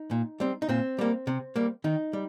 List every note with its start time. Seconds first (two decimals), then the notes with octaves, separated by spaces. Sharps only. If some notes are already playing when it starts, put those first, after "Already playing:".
Already playing: D#4
0.11 A#2
0.40 G3 C4
0.62 D#4
0.69 A#2 C4
0.99 G3 A#3
1.27 C3
1.56 G3 A#3
1.84 D#3 D#4
2.13 G3